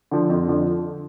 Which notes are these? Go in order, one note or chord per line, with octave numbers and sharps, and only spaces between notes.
D3 F3
F2
D3 F3